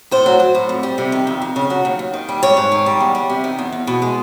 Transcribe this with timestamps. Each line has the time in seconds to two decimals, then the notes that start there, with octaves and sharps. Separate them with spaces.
0.11 A2 C5
0.26 F#3
0.40 F#3
0.55 A2
0.69 F2
0.83 G3
0.98 C3
1.12 D#3
1.27 F2
1.42 F2
1.56 C#3
1.70 F#3
1.85 D#2
1.99 D#2
2.14 D#3
2.29 G3
2.43 G#2 C#5
2.57 G#2
2.72 D#3
2.86 G3
3.00 E2
3.15 G3
3.30 C3
3.44 D#3
3.59 E2
3.72 E2
3.87 B2
4.02 G#3